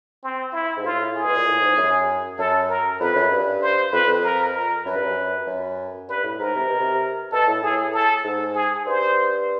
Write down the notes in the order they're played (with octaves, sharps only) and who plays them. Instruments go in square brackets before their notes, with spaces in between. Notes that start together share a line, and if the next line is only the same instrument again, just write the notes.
[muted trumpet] C4
E4
[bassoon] G#2
[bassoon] A2 [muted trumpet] F4
[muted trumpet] G#4
[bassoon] B2
A#2
A2
G#2
F#2
[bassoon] F#2 [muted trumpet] A4
[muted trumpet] A#4
[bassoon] F2 [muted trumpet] B4
[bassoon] F#2
G2
[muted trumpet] C5
[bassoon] F2 [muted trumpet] B4
[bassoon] F2
[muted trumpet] A#4
A#4
[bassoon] F#2 [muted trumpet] B4
[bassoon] G2
F#2
F#2
[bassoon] G2 [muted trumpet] B4
[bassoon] A2
[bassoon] G#2 [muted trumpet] A#4
[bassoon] C3
B2
C3
[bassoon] B2 [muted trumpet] A4
[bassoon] A2
[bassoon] A2 [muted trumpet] G#4
[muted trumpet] A4
[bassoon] G#2
[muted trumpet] G#4
[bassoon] G2 [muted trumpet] C5